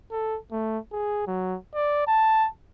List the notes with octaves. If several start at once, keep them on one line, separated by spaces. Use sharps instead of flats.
A4
A3
G#4
F#3
D5
A5